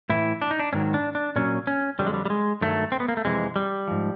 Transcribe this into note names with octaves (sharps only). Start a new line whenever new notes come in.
A2 E3 E4
D4
D#4
D4
G#2 D#3 F#3 C#4
D4
D4
A#2 F#3 C#4
C#4
F2 D3 F#3 G3
G#3
G3
G3
G#3
G2 D#3 F#3 A3
C4
B3
A#3
A3
F2 C3 E3 G#3
G3
G#2 F3